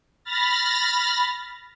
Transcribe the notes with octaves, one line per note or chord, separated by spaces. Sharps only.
B5 F6 A6 A#6